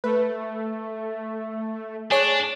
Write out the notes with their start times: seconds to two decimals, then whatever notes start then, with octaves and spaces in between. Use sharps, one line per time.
0.04 A3 B4
2.11 D4 G#4 C#5 F#6